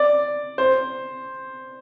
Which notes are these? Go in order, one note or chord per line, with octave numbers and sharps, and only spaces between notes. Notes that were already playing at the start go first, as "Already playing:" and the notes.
Already playing: D5
C5